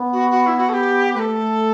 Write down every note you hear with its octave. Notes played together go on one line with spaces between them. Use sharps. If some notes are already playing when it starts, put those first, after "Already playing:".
Already playing: B3
F#4
F#4
E4
F#4
A4
G4
A3 A4 B4